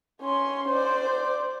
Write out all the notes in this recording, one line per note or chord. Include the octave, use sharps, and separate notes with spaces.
C#4 C6
C5 D5